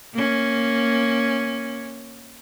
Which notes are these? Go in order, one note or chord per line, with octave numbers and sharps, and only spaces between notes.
A#3 C#4